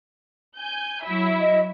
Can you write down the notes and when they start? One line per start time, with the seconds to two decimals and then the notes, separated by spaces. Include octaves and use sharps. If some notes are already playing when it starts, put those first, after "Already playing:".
0.57 G#5 G6
1.03 F#3 E4 E5
1.41 D#5